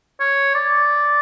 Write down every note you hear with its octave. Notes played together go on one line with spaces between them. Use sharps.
C#5
D5